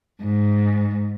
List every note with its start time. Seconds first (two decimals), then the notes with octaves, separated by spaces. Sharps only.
0.23 G#2